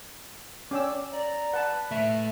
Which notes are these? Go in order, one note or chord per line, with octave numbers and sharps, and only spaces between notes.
C#4 D5 G5 D6 E6
D5 A#5
B4 F#5 A5
A2 A3 E5